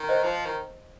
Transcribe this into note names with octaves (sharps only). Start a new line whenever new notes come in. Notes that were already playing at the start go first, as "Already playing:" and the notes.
Already playing: D#3
C5 D#5
F3 C5
D#3